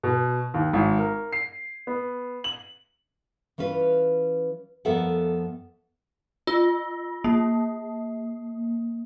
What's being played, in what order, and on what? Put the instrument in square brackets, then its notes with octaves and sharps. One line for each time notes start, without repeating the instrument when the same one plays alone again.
[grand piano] B2
D#2
G#1
A#4
C7
B3
F#7
[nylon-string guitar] E3 C#4 F4 B4
F2 B3 A4 A#4 E5 F#5
[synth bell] F4
A#3